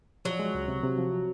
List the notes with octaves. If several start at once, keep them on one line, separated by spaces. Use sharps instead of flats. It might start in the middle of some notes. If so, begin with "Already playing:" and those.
F3 F#3
G#3
C#2
C3
C3
F3